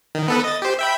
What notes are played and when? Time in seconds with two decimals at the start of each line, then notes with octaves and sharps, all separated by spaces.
0.15 D#3
0.28 B3 A4 B4
0.44 D#5 A6
0.62 G4 C5
0.79 E5 G5 B5